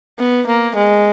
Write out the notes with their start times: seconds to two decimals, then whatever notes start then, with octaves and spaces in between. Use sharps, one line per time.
0.19 B3
0.47 A#3
0.75 G#3